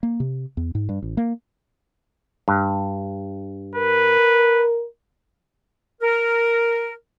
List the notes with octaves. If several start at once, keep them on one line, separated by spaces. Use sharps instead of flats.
A#3
C3
E2
G#2
G2
A1
A#3
G2
A#4 B4
A#4